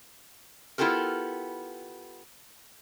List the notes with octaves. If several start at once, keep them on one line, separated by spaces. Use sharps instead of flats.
B3 E4 F4 G4 A4 A#4